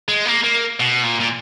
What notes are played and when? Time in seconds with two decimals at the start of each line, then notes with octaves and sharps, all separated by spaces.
0.09 G#3
0.26 A#3
0.44 A#3
0.80 B2
1.04 A#2
1.20 A#2